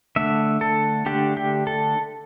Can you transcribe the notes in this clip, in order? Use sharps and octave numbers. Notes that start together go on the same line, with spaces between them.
D3 A3 D4 E5
A4
D3 A3 D4 G4
G4
A4